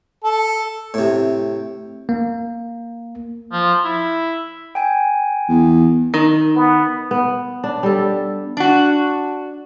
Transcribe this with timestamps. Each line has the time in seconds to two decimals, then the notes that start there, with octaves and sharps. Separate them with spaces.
0.24 A4
0.94 A2 C3
2.09 A#3
3.53 F3
3.85 E4
4.75 G5 G#5
5.49 E2
6.14 D#3
6.55 B3
7.11 B3
7.64 D4
7.83 G3 A4
8.57 D4 F#4